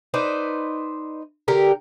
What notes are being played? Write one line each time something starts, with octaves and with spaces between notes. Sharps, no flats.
D#4 B4 C5 D5
D3 G4 A#4